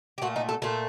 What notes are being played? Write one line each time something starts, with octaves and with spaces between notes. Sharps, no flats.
G4
A#2 A3 F#4
D#4
A4
A#2 A3 A4